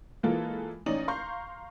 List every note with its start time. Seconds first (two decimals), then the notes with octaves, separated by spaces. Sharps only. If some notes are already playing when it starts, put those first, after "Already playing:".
0.23 E3 G#3 A#3 F4 A4
0.86 A1 C#4 D#4 D5 F#7
1.08 F5 A#5 C6 C#6 G6